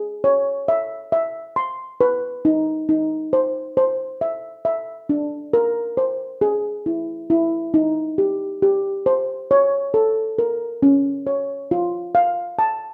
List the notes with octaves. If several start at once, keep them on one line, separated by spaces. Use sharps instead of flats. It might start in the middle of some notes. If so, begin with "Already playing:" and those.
Already playing: G#4
C#5
E5
E5
C6
B4
D#4
D#4
C5
C5
E5
E5
D4
A#4
C5
G#4
E4
E4
D#4
G4
G4
C5
C#5
A4
A#4
C#4
C#5
F4
F5
A5